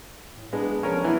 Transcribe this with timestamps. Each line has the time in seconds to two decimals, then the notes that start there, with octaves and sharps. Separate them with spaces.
0.37 A2
0.53 G#3 B3 D4
0.83 F3 C#4 A#4
1.04 E3 B3